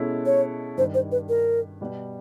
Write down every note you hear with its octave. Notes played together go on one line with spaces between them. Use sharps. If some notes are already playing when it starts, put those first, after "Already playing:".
Already playing: B2 G#3 C#4 E4 A4
C#5
G2 D#3 G3 C5
C5
B4
A#4
B2 G3 B3